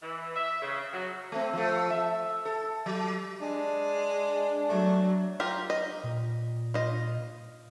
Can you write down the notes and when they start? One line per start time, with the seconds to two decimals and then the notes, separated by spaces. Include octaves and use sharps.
0.02 E3
0.36 E5
0.62 C#3
0.93 F#3
1.32 A3 C4
1.53 F3 A3
1.90 E5
2.45 A4
2.86 F#3
3.42 G#3 D4
4.69 F#3 A3
5.40 F4 G4 A#4
5.70 D#5
6.04 A#2
6.74 F4 D#5